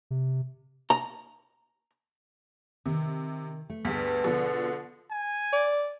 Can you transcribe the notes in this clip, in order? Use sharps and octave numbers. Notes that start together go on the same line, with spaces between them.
C3
A#5
C3 D#3
A3
D2 G2 B3 G#4 B6
B2 D3 F3
G#5
D5